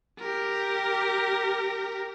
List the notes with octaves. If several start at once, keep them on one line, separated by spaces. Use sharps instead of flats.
G4 A#4